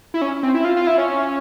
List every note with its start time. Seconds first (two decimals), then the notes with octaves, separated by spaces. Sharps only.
0.14 E4
0.22 C#4
0.43 C4
0.55 E4
0.65 F4
0.76 F4
0.87 E4
0.98 C#4